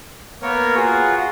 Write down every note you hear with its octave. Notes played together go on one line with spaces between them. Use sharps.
A#3 B3 A#4 C#5
F4 F#4 G#4